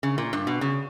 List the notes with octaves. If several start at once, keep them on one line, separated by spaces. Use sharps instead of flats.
C#3
A#2
G2
B2
C#3